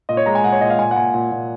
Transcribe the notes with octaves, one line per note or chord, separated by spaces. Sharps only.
A#2 D#5
C#5
G#3 A#5
G#5
A#2 F#5
C#5
A#2 D#5
F5
A#2 G#5
F#5
A#2 G#5
A#2 F#5
A#2